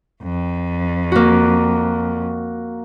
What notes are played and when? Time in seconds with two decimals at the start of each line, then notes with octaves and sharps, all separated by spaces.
0.23 F2
1.12 A#3 F#4